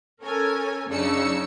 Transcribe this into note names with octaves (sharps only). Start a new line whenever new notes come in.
C#4 A4 A#4 C#5 G#5
F#2 C#3 D4 D#4 E6 C#7